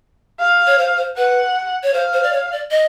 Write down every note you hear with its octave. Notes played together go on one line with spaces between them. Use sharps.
F5
C#5
C5
C5
B4 F#5
C#5
C5 F5
C5
D5
C#5
D5
D#5